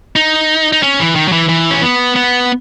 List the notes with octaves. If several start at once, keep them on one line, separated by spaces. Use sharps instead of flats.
D#4
D#4
C#4
E3
D#3
F#3
E3
E3
C#4
B3
B3